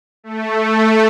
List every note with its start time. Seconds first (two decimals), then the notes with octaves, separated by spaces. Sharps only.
0.24 A3